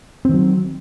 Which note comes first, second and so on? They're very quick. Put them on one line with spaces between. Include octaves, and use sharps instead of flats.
C4 D#3 F#3